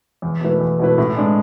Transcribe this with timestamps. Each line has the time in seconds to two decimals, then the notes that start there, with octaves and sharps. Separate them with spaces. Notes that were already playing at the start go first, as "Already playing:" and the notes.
0.22 E2
0.41 B2 A3 E4 B4
0.61 E2
0.79 B2 A3 E4 B4
0.98 A2
1.16 G#3 D4